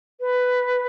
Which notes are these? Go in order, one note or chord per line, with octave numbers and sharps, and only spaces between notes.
B4